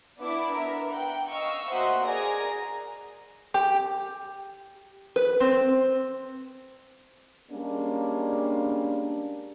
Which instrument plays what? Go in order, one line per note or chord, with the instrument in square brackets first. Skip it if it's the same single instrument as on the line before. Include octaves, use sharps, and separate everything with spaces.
[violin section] B3 D4 E4 D6
B3 A#4 E5
F#5 G5
D#5 F5 C#6 E6
A#3 F#4 C5 D#5 E5 F#5
G#4 A#4 D5 G#5 A#5 A#6
[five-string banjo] G4
B4
C4
[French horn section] G3 G#3 A#3 C#4 D4